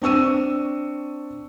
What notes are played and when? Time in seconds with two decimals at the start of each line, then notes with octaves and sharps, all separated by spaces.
0.02 C4 D4 C#6 E6 D#7